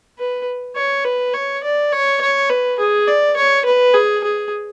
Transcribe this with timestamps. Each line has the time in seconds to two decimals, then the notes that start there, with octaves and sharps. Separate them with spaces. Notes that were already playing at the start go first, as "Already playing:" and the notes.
0.18 B4
0.76 C#5
1.05 B4
1.34 C#5
1.63 D5
1.92 C#5
2.21 C#5
2.50 B4
2.79 G#4
3.07 D5
3.36 C#5
3.65 B4
3.94 G#4
4.24 G#4